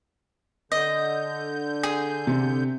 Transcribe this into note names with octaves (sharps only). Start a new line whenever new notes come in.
D3 D#5 G6
G#4
C3